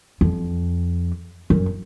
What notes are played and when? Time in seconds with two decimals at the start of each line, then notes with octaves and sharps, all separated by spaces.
0.21 F2
1.50 F#2